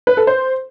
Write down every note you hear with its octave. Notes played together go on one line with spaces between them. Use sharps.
B4
A4
C5